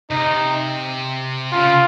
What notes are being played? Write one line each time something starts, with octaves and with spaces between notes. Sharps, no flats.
C3 D#4
C#3 F4